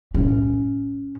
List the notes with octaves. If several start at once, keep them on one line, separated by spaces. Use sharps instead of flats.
A2 C#4